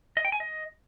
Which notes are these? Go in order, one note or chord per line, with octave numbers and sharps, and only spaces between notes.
D#5
G5
G#5
D#5